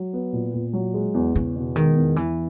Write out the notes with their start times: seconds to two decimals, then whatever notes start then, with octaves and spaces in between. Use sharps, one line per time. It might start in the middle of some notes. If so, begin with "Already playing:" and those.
Already playing: F#3
0.13 B3
0.33 A#2
0.53 A#2
0.73 F#3
0.94 G#3
1.14 E2
1.35 E2 C#3
1.56 B2
1.76 D#3 G#3
1.96 E2
2.16 E2 E3